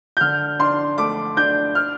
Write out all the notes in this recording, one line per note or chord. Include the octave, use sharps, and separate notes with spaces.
G6
D3 F6
D4 C6
A3 D6
D4 G6
F6